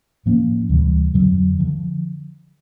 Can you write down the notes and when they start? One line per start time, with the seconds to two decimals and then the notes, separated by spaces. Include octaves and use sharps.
0.26 A2 F3 A#3 C#4
0.69 D2 C3 E3 G3
1.14 F2 D3 F#3
1.59 D3 F3